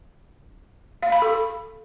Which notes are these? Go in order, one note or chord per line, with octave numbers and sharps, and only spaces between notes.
F5
B5
A4